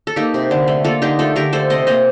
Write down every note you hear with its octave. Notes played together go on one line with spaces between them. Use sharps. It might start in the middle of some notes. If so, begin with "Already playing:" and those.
A4
A#3 D#4 G4
C3
D3
A3
A#3 F4 A4
D3 D#4 G4
A3 F4 A4
D3 G4 A#4
A3 A4 C5
C3 C5 D#5
A#3 C5 D#5